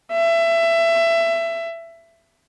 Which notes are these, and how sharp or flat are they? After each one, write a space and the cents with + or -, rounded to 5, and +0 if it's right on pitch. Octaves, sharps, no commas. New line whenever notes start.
E5 +20